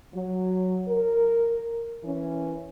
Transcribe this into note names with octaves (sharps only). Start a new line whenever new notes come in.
F#3
A#4
E3 C#4